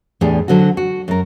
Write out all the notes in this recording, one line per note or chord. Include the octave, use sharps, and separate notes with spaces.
E2 A2 D4 G4 G#4
D3 F#3 C4 F#4
F#4
F#2 A#4